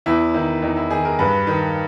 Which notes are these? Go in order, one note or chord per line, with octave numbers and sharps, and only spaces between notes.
E2 E4
D#3 E4
E2 D#4
E4
D#3 G#4
A#4
G2 B4
D#3